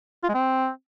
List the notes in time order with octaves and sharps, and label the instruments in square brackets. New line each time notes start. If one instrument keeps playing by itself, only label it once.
[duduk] F4
G#3
C4